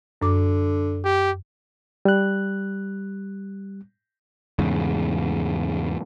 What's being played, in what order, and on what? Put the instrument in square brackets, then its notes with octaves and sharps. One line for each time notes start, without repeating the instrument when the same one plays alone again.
[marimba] F#2 D6 [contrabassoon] D3
[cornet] G4
[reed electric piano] G3 F#6
[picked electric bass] E2 G#2 C#3